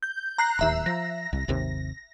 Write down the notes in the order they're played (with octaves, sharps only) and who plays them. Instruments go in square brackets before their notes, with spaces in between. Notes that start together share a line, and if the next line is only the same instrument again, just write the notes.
[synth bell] G6
A#5 F#6 C7
[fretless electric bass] D1 D#2 [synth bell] E5 A#5
[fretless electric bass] F3 [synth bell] A#6
[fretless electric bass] C2
G#1 D#2 C3